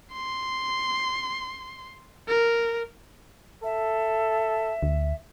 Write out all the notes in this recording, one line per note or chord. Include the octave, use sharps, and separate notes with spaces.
C6
A#4
A4 E5
D2